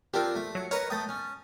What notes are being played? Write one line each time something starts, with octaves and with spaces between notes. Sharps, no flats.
C4 D4 F4 G4 A#4
A3
F#3 C#7
A#4 B4 C#5 D#5 A#5 A#6
A3 G5 D#6 A6
C#4